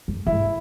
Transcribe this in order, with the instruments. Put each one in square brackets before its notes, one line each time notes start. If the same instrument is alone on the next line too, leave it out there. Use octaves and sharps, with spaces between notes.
[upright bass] F#2
[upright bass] G#2 [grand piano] E4